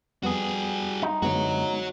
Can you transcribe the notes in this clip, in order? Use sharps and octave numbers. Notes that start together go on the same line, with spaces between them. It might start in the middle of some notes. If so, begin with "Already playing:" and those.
F2 G3 B3 F#4 G#4 D#6
D#4
F#2 D3 G#3 B3 F#4 C#5